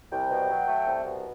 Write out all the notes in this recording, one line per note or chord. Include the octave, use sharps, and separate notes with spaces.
C2 G5
B2
F#3
A3
C2
B2